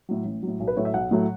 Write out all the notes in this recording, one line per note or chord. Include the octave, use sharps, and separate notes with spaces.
A2 F#3
A1
A2 F#3
B1
B4
A2 F#3 A3 C#5
E5
B1 F#5
A2 F#3 A3